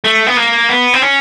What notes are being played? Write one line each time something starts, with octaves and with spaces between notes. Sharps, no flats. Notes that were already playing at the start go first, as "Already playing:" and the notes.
A3
B3
A#3
B3
C4
C#4